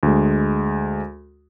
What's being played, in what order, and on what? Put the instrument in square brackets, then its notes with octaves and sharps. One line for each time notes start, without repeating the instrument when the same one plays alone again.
[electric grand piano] D2 G#3